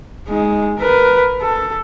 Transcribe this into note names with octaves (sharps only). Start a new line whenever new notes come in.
G#3 D#4
A#4 B4
A4